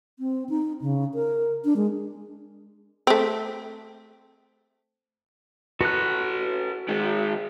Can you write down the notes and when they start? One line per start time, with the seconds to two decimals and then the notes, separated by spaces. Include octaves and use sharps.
0.19 C4
0.49 D#4
0.82 C#3
1.14 A#4
1.65 D4
1.76 G#3
3.07 A3 C4
5.81 F#4 A4 B4 F#6
6.88 D#3 G#3